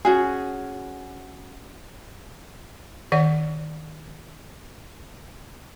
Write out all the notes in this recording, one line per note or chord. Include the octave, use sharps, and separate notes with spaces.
C#4 F#4 G#4
D#3 D5 F#5